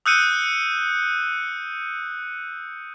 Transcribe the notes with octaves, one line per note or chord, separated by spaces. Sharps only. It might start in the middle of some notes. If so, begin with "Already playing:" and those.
D#6 E6 F#6 G6 C#7 D#7